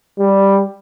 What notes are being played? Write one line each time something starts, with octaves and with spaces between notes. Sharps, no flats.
G3